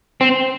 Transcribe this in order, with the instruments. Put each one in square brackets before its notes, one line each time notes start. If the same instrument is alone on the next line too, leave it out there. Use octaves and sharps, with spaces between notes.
[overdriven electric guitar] C4